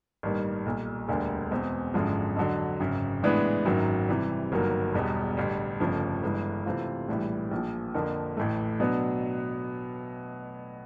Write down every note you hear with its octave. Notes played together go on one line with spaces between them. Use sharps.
A1 G2 D#3 G3 A#3
B1 A#2 G3
E1 D2 D3 G3 A#3
E2 B2 G#3 C4
G#1 F#2 D3 F3 G#3
F2 D3 F#3
G#1 F#2 C#3
A2 E3 G#3 B3 D4
G#1 F#2 D#3 F#3
C3 E3 G3
G1 G2 D#3 F#3 A#3
E1 E2 B2 G3
A1 G2 D3 G3
G1 F2 C#3 F3 A3
G1 G2 E3 G#3
C3 E3 A3 C4 F4
A#1 A2 E3 G3
A#1 A#2 F3
F2 D3 F3 A#3
A1 A2 E3 A3
B2 F#3 B3 D4